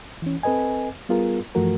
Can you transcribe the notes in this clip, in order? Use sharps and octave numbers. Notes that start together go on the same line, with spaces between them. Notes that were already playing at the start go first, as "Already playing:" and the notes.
E3 C#4
C4 A4 B4 D#5 G#5
G3 B3 F4 G#4 A#4
G2 E3 F3 A3 F#4 A#4